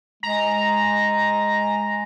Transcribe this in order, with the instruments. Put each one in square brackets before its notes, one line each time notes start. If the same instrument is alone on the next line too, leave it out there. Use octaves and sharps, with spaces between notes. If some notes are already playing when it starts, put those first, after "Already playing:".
[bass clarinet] G#3 [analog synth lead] A#5